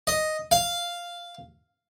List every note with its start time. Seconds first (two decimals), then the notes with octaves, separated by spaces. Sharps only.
0.07 D#5
0.51 F5